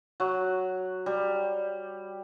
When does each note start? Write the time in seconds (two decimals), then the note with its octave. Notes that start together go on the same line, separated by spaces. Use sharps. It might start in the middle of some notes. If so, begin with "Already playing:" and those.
0.20 F#3
1.06 G3